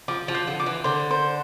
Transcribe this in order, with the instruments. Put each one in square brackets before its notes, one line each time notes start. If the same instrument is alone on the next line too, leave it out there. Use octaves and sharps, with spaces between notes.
[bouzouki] F3 [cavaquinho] D6
[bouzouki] F3
[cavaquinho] C5
[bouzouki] D3
[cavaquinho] D6
[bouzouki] E3
[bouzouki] D3 [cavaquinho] C5
[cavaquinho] C5